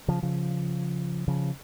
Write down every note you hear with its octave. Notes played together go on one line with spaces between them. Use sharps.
C#3 F3
C#3 F3
C#3 F3